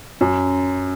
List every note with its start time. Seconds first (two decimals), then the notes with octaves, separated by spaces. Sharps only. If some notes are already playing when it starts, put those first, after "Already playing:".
0.21 F#2